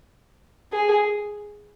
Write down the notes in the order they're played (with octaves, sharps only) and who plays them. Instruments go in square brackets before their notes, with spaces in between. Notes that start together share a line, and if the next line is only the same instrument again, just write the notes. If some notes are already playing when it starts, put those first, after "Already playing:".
[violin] G#4